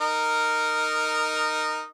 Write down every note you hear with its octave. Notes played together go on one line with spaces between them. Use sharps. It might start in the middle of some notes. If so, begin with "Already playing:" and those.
D#4 A#4